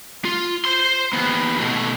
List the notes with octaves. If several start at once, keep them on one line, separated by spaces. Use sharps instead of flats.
F4
C5 C6
D#2 B3
B2 A3